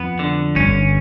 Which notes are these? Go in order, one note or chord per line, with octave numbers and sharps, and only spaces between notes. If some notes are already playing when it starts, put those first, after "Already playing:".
Already playing: F2 B3
D3
G1 G2 C#4